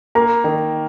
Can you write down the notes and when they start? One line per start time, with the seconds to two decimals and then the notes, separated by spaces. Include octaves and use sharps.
0.15 A#3 A#5
0.44 D#3